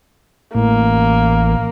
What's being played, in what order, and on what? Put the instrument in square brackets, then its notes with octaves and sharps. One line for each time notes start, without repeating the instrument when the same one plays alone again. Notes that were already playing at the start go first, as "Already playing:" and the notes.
[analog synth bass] A1 [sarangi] A#3